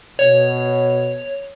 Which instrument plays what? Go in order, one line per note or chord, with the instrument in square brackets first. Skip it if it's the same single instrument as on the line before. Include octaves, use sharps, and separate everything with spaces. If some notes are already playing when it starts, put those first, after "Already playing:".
[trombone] B2 [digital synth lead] C#5